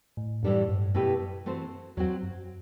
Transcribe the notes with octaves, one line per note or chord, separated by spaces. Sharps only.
A2
F#2 A2 E3 G3 D4 A4
G2
F#2 B2 A3 E4 G4 B4
E3 A3 C4 F#4 C5
E2 F#3 C4 F#4
F#2